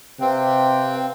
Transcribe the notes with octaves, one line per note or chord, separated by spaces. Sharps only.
C3 C4 B4 F5 G5